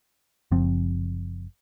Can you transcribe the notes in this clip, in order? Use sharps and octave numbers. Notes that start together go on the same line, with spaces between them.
F#1 F3 C4